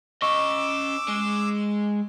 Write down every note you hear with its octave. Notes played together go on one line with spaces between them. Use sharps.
C#4 D#5 C#6 D6 E6
G#3